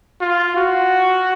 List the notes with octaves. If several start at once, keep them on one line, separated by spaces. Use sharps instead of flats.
F4
F#4